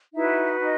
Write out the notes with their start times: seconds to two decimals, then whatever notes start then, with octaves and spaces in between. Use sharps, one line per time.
0.15 D#4 E4 F#4 B4 E5
0.60 D#4 D#5